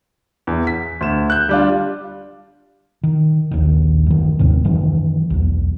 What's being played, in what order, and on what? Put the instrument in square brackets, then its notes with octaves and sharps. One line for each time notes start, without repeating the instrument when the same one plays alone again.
[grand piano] E2
B6
D2 E7
F#6 G6
G3 D4 F4
[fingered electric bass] D#3
A#1 D#2 D#3
F#2 D#3
G1 D#2 G#2 C3
F#2 D#3 E3 F#3
B1 E2